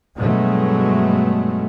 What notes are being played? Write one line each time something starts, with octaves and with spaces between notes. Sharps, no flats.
G2 B2 F#3 G#3 A3